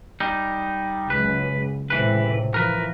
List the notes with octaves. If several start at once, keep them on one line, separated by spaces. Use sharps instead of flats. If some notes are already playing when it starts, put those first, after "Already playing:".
G3 D#4
C#2 F#2 C#3 B4
C#2 A2 C3 E3 B4
E3 F3 A#4 B4